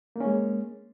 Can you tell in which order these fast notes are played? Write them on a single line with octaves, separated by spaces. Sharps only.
A#3 C#4 G#3